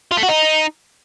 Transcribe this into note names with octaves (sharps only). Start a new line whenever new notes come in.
F4
A3
F#4
D#4